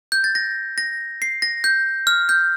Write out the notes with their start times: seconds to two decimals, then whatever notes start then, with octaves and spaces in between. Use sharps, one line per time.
0.12 G6
0.24 A6
0.35 A#6
0.78 A#6
1.22 C7
1.42 A#6
1.64 G6
2.07 F6
2.29 G6